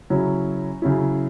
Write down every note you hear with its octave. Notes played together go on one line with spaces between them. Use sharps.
C#3 F#3 C#4 E4
C#3 F#3 C#4 E4